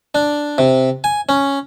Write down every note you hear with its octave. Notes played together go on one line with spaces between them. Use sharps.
D4
C3
G#5
C#4